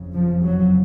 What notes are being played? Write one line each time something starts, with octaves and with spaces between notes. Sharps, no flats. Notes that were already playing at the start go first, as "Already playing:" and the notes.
Already playing: F#1 F2 C#3
F3
F#3